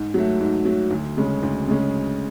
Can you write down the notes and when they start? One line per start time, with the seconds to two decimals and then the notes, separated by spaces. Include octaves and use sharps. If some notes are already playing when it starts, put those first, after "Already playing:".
Already playing: G#2
0.14 F#3 A3
0.41 G#2
0.65 F#3 A3
0.91 D2
1.17 C#3 G#3 C#4
1.43 D2
1.68 C#3 G#3 C#4